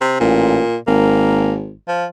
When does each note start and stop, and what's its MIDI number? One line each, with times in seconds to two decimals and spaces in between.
0.01 0.17 48
0.20 0.61 33
0.20 0.77 46
0.87 1.74 32
0.87 1.55 58
1.88 2.06 53